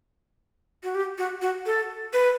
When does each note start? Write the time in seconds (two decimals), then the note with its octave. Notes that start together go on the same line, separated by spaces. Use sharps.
0.84 F#4
0.95 G4
1.18 F#4
1.42 F#4
1.66 A4
2.13 B4